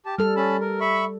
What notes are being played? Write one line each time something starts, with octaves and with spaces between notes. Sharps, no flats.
G4 A5
G3 A4 F6
C#4 A5 B5
A#4
E5 B5 C#6